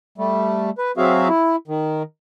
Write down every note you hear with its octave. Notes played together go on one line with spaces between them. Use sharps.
G3 A3
B4
F#3 C4 F#4 G#4 E5 F5
E4
D#3